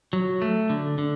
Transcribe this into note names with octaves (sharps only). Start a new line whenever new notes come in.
F#3
A3
D3
D3